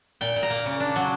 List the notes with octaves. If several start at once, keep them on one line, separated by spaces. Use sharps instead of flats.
A#2 G5
A#2
A#5
A#3
C#3
D4
F#3